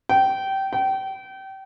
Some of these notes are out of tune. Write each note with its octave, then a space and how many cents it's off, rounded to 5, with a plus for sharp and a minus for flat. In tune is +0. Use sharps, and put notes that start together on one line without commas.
G5 -20
G5 -30